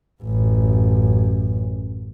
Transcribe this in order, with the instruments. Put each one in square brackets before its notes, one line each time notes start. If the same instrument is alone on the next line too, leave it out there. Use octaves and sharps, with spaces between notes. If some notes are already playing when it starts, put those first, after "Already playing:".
[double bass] A1 F#2